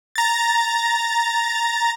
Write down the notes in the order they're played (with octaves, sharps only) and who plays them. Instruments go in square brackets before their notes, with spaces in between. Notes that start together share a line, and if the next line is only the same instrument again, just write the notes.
[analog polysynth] A#5 A6